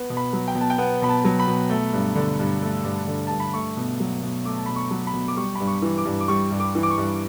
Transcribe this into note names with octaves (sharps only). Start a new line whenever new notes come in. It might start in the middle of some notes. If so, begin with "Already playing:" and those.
Already playing: B3
B2
B5
F#3
G5
B2
A5
G5
B3 F#5
B2 B5
A5
F#3
B5
B2
A3
G2
D3
G2
A3
G2
D3
G2 A5
B5
A3 C#6
B2
F#3
B2
A3 D6
A5
B2 B5
C#6
F#3
B5
B2
D6
G3 C#6
G2 B5
C#6
E3
D6
G2
D6
G3 C#6
G2
D6
E3
D6
C#6
G2